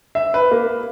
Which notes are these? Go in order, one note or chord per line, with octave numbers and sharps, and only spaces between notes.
E5
B4
A#3